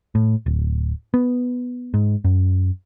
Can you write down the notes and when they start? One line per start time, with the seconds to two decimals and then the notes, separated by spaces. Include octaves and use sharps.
0.15 A2
0.46 D1
1.14 B3
1.94 G#2
2.24 F#2